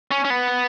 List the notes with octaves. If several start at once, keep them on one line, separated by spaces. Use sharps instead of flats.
C#4
C#4
B3